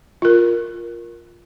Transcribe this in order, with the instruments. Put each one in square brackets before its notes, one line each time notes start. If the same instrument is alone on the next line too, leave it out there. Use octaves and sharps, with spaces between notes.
[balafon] F4 A#4